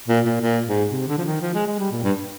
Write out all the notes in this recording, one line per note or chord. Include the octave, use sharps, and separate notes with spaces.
A#2
A#2
A#2
G#2
C3
D3
F3
D#3
F3
G#3
G#3
G3
A#2
G2